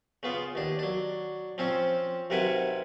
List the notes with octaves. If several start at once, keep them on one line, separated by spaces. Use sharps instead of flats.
C#3 B3 F4
D#2 D4
F#3 D4
F3 C4 C#4
B1 C3 A#4 B4 F#5 G#5